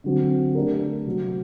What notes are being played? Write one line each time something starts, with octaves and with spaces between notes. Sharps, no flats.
D3 F#3 C4
A3 D4 G4 A#4
C3 F#3 C4